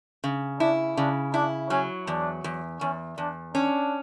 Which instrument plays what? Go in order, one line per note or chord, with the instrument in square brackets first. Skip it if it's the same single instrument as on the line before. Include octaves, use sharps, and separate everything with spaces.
[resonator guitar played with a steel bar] C#3
[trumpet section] D4 [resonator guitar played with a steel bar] E4
[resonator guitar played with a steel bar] C#3 [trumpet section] D4
[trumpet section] D4 [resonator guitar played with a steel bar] E4
[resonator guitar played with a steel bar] F#3 [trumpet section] C#4
[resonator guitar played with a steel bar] E2 [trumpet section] D4
[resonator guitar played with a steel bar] E2
[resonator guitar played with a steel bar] E2 [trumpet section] C#4
[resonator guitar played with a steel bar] E2 [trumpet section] D4
[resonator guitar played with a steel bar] C#4 [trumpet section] D4